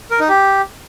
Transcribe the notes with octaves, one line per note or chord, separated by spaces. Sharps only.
A#4
D#4
G4